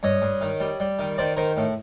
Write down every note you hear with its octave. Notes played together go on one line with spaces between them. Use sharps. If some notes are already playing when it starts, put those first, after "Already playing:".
G2 C#5 D#5
G2
D#3
G3
G3
D#3
D#3 C5 D5
D#3 A#4 C5
A2